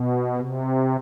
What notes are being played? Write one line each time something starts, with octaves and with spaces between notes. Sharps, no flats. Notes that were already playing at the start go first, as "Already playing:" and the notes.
Already playing: B2
C3